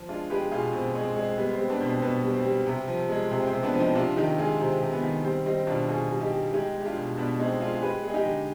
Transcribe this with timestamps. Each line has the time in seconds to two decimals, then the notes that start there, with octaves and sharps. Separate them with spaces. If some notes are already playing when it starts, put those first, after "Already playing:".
Already playing: F3
0.09 G#3 D4 F4
0.30 G#3 G4 B4
0.51 B2 F4 G#4
0.73 B2 C4
0.95 G#3 C4
1.16 G#3 C4
1.38 G3 B3
1.54 C4
1.59 G3
1.69 B3 D4
1.80 B2
1.86 C4
2.02 B2 B3
2.24 G3
2.34 C4
2.45 G3
2.67 C3
2.88 F3
3.09 G#3
3.31 C3 C4
3.47 C4
3.52 C3
3.63 B3 D4
3.74 F3
3.80 C4 D#4
3.95 C3 D4 F4
4.17 D#3 D#4 G4
4.38 G#3 F4 G#4
4.60 C3 C4
4.81 C3
4.92 B3
5.03 D#3
5.24 G3 C4
5.46 G3 C4 D#4
5.67 B2 D4 F4
5.89 B2 F4 G#4
6.10 G3
6.21 D#4 G4
6.32 G3
6.53 G#3 D#4 G4
6.74 G#3
6.80 G4
6.86 D4 F4
6.96 B2
7.17 B2 B3 D4
7.39 G#3 C4 D#4
7.61 G#3 D4 F4
7.75 G#4
7.82 G#3 G4 B4
8.04 G#3 G#4
8.14 D#4 G4
8.25 D3